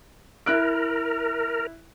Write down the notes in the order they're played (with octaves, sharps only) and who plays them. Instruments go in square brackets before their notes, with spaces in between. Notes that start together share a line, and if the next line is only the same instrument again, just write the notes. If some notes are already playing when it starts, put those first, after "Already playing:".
[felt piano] E4 F#6 D7 [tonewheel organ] A#4